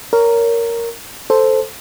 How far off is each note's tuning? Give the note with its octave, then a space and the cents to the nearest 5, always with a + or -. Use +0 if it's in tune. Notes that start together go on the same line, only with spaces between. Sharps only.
A#4 -5 C#5 +20
A4 +0 C5 +0